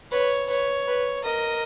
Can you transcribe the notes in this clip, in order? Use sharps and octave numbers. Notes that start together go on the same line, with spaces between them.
B4 C#5
B4 C#5
B4
A#4 D#5